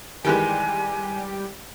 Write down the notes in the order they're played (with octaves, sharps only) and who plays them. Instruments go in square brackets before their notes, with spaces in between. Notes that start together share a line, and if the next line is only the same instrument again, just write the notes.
[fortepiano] D#3 E3 G#3 [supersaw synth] G3 G4 [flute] G#5